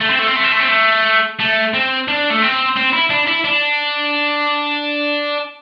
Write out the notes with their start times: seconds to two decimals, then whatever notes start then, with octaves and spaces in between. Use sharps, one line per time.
0.01 A3
0.10 C4
0.19 A3
0.27 C4
0.36 A3
0.44 C4
0.52 A3
0.60 C4
0.68 A3
1.40 A3
1.74 C4
2.08 D4
2.30 A3
2.42 C4
2.77 C4
2.93 E4
3.10 D4
3.28 E4
3.44 D4